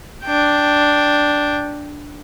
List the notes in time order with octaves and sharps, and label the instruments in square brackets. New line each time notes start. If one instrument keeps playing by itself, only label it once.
[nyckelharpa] D4 G5